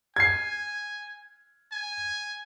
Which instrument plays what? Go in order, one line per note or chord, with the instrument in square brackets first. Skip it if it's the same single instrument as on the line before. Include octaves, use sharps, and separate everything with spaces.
[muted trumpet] G#5 [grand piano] G#6 C7
[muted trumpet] G#5